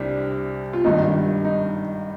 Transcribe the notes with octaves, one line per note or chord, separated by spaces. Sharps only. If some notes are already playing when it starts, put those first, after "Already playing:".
Already playing: C2 C3 G3 D4
F4
G#1 G2 D#3 G3 D#4
D#4